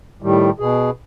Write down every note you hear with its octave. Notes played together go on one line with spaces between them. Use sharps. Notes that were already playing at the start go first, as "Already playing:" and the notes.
A2 D#3 G3
B2 G#4